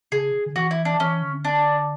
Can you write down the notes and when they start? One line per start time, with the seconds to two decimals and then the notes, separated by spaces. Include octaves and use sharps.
0.12 C#3 G#4
0.46 D3
0.56 E3 F#4
0.71 E4
0.85 D4
1.00 E3 C#4
1.22 D3
1.44 D4